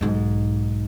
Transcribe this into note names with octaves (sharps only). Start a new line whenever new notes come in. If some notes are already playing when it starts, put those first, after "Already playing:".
B1 G#2